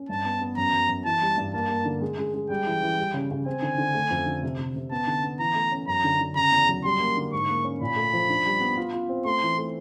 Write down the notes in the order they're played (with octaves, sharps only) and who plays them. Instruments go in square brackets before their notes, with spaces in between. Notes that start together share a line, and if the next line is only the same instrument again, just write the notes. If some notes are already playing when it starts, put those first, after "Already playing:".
Already playing: [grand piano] C#4
[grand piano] G2 [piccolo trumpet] A5
[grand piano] B3
B3
[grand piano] F#2 [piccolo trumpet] A#5
[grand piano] F#2
F#2
[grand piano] E3 [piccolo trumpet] A5
[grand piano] G3
G2
[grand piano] A#3 [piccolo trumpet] A5
[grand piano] A#3
D3
G#3
G#3
G#3
[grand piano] G3 [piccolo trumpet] G5
[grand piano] E3
E3
G3
C#3
C#3
[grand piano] C4 [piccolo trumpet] G#5
[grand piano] D3
D3
A3
F2
D3
C3
C3
C3
[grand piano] B3 [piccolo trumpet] A5
[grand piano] D3
B3
[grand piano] E3 [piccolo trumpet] A#5
[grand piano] A3
C#4
[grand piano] F#2 [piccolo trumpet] A#5
[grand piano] D3
D3
[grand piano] C#3 [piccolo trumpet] A#5
[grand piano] E2
F#3
[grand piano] G3 [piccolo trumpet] C6
[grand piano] A#3
D3
[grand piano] G#2 [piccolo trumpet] C#6
[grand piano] A#3
C#4
[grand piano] A#2 [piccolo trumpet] B5
[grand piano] A3
F3
D4
G3
B3
F4
F4
C4
[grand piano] A3 [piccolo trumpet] C6
[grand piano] E3
A3